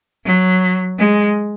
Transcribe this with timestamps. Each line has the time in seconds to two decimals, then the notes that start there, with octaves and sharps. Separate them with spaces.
0.25 F#3
0.98 G#3